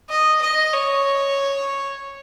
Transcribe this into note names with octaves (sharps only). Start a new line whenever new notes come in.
D#5
D#5
C#5